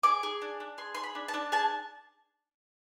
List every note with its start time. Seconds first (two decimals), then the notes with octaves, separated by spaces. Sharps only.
0.03 G#4 D6
0.23 G#4
0.42 D4
0.60 D4
0.78 G#4 C6
0.95 G#4 C6
1.04 B5
1.15 D4
1.28 A5
1.34 D4
1.52 G#4 A5